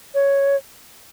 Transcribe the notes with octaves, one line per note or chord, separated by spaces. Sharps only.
C#5